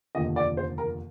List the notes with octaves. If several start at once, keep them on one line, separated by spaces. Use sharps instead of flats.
F1 D#2 D3 F3 D#5
D5
C5
A#4